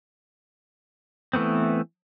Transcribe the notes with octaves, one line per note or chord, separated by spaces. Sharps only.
E3 A3 B3 C4